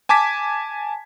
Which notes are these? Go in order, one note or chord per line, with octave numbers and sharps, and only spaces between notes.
G#5 A5 D6 G#6 B6